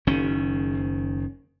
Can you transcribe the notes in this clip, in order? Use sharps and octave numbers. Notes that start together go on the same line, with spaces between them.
F#1 D#3 C#4